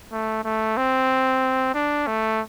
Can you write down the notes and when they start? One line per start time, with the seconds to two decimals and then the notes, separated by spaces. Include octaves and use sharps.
0.12 A3
0.44 A3
0.77 C4
1.74 D4
2.07 A3